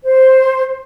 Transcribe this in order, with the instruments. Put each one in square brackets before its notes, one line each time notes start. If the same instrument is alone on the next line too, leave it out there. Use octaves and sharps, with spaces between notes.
[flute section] C5